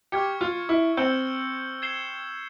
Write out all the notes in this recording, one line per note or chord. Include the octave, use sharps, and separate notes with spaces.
G4 C#6 F6 G#6 C#7
F4
E4
C4 E6 G6 C#7 G7
G#6 C7 E7 G7